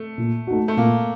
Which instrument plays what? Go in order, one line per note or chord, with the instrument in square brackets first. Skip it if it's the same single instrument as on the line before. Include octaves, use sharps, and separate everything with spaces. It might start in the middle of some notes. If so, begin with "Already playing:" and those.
Already playing: [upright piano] A3
[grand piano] A#2
A3 D#4 F#4
[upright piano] A3
[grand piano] A#2 [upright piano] A#3